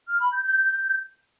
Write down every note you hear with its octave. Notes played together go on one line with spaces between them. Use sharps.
F6
B5
G6
G6